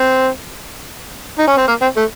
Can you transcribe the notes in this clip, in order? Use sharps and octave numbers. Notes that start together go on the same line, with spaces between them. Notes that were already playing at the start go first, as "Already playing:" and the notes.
Already playing: C4
D#4
C#4
C4
A#3
C4
A3